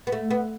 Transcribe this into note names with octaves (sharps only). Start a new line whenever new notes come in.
B3
A3
B3